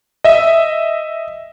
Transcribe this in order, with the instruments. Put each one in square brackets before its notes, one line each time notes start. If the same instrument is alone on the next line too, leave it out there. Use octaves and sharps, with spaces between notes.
[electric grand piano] D#5 E5